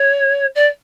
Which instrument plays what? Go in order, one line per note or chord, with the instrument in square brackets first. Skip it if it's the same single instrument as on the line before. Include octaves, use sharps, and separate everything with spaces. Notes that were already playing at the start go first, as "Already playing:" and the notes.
Already playing: [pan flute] C#5
D5